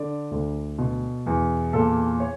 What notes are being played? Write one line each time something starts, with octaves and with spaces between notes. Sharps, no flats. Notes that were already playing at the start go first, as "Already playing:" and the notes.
Already playing: D3 D5
D2
B2
E2
A#2 A4
C#5